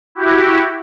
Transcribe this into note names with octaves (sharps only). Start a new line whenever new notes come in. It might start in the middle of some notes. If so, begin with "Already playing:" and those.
E4 F#4 G4